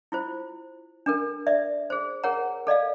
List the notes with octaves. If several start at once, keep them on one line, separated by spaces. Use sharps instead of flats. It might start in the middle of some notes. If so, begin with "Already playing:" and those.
E4 F4 C5
D4 A4 A#4
D5 E5
G#4 C5
G#4 A#4 C#5 F#5 A#5
A4 D5 D#5 F5